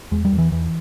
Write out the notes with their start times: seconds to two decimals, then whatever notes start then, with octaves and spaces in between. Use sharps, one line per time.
0.11 E2 G#3
0.25 G3
0.32 E2
0.38 E3
0.52 E2 E3